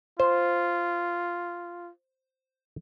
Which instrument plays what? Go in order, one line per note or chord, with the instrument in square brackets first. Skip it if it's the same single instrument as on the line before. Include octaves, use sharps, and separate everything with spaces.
[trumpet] F4 [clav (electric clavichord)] C5